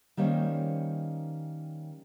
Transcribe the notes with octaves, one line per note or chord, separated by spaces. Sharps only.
D#3 G3 A#3 C#4 C5 C#5